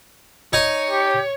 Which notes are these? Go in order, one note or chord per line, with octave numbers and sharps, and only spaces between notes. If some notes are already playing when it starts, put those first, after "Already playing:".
D#4 C#5 G#5
G4